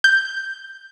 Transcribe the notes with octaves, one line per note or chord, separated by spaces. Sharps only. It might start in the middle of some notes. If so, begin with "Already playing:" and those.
G6